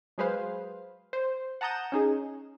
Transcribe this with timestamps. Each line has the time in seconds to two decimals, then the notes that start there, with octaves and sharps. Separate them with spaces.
0.18 F#3 G#3 G#4 B4 C5 F5
1.13 C5
1.61 F#5 A5 A#5 D#6 G6 E7
1.92 C#4 D#4 G#4